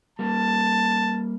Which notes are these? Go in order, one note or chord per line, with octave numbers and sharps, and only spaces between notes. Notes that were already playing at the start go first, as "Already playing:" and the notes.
G3 A#3 A5